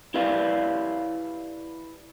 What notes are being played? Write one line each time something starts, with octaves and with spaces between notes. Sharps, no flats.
E4 G4 B4 D5 F5